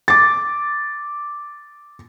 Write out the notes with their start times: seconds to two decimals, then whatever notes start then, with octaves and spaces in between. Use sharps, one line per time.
0.08 D6 A6